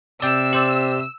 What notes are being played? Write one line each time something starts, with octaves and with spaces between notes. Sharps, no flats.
C3 D5 G5 E6
G4 C5 D5